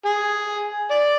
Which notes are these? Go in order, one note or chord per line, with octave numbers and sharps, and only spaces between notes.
G#4
D5